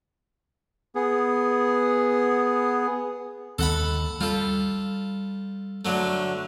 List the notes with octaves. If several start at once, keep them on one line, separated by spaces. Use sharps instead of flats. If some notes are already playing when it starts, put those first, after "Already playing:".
B3 G#4
D#2 A4 F#5 B5
G3 F4 A4
D3 F#3 A3